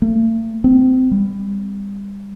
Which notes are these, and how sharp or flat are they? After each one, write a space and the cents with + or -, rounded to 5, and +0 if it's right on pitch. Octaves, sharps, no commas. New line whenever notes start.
A3 +45
C4 -25
G3 +30